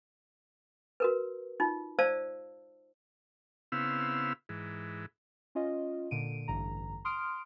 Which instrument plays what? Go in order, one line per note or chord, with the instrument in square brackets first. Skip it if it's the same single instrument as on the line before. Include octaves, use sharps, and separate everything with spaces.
[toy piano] F#4 A#4 B4
D#4 F4
C5 D5 F5 A5 E6
[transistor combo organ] C#3 B3 C4 E4 F5 E6
G#2 E3
[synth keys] C#4 F4 D#5
A#2 D3 D7 D#7
A1 G2 D3 A#5
C6 D#6 F6 D7